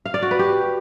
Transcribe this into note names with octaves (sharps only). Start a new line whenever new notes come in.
F5
D5
F#4
B4
G4